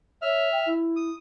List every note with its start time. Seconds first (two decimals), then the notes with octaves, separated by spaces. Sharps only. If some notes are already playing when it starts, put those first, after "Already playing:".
0.22 C#5 E5 F6
0.52 G5
0.66 E4
0.96 D#6